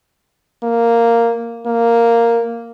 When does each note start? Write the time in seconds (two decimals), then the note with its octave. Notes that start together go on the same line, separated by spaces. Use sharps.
0.63 A#3
1.66 A#3